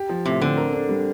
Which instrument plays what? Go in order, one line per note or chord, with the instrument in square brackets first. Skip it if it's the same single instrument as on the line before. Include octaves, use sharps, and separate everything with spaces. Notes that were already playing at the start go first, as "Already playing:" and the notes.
Already playing: [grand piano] G4
F3
[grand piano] A2 [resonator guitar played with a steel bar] C3
[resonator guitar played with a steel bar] D3 [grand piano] C4
[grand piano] A#4
D4
G3